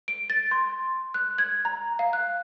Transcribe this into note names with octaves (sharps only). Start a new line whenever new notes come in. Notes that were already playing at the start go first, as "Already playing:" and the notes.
D7
A6
C6
F#6
G#6
A#5
F5
F#6